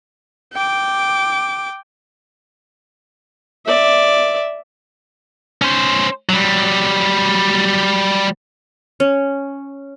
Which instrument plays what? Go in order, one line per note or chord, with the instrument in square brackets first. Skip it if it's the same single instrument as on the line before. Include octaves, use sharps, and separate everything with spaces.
[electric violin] G5 D6
[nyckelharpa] D5 E5
[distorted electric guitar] C#4 C5
F#3 G3
[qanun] C#4